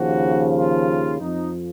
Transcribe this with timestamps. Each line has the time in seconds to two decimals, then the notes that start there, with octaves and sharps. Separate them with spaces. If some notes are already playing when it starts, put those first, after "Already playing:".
Already playing: D#2 C#3 F3 F#4
0.55 F4
1.20 F2 F3 D#4